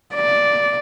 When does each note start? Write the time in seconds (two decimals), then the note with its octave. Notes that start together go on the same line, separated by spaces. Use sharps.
0.14 D5